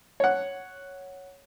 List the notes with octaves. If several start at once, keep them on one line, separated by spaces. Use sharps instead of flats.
C#5 F#5